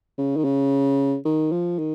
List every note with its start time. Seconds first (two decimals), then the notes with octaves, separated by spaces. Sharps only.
0.18 C#3
0.36 D#3
0.44 C#3
1.25 D#3
1.52 F3
1.78 D#3